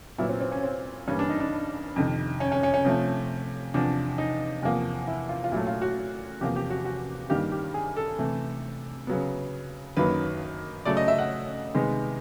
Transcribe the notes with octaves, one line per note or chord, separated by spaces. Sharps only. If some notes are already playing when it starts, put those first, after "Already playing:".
A#2 F#3 B3 E4
C4
C4
C#4
C4
G2 E3 G3 A#3 C#4
D4
D#4
D4
F2 C3 D#3
C#4
C#4
C#4
C#4
C3 F3 A3
E2 C3 F3 D4
D#4
E2 C3 F3 A#3
E4
F4
F4
A#2 F#3 A3 E4
F4
F#4
E2 C3 F3 A#3 G4
G4
F#4
F#4
G2 D#3 G3 A#3 G4
G4
G#4
A4
C3 E3 A3
C#3 F#3 B3
F#2 D#3 F#3 A#3 B4
C#3 F#3 A3 D5
D#5
E5
F#5
C3 D#3 G#3 B3